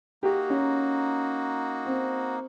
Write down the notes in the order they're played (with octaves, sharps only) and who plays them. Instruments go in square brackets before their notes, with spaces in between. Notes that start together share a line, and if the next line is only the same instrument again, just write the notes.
[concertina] A#3 D#4 F#4 [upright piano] G4
[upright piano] C#4
C4